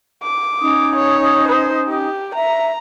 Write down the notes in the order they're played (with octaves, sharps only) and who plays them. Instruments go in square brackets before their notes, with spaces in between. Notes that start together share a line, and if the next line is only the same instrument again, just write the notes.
[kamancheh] D6
[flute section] C#4 D#4 D#6
[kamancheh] C#5
C5
G4
[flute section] E5 [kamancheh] A#5